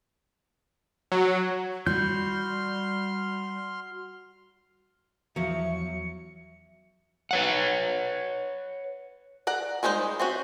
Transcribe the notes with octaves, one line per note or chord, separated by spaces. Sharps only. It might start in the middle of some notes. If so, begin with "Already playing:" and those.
F#3
G3 F#4 C6 F6 G6
E2 F3 F#3 E5 C#7
B4 C#5 F#5
D5 F#5 A#5
G3 G#3 D#4 F#4 C5
C4 C#4 F#4